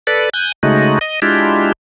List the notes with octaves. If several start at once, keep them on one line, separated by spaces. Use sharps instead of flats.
A4 B4 D5
G#5 F#6 G6
C#3 G#3 A3 D#4 F#4
D#5
G#3 D4 E4 F4 G4